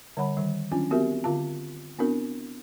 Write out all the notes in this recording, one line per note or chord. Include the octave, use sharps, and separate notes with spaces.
D3 G3 C#5 F#5 B5
D#3 G3
D#3 F#3 C#4 D4 F4 G#5
B3 C4 F#4 G4 A#4 E5
D3 F4 F5 A5
B3 C4 D4 E4 F#4 A#4